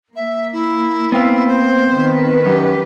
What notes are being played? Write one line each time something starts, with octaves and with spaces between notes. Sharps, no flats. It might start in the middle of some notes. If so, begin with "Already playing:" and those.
A#3 E5
E4
B3 C4 F5
C5
D#3 B4
F#2 G4